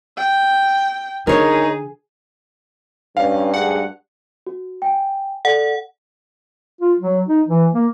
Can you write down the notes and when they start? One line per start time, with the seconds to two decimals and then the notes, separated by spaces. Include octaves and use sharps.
0.18 G5
1.27 D3 D#4 G#4 A#4 C#5
3.17 G2 C#4 D4 B4 F5
3.54 D2 G#2 G#4 F#5
4.47 F#4
4.82 G5 G#5
5.45 A4 D5 F#5
6.81 F4
6.99 F#3
7.28 D#4
7.48 E3
7.74 A#3